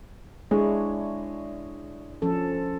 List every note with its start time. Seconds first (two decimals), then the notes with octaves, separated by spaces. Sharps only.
0.51 G#3 D4 E4 C#5
2.22 F3 C#4 A4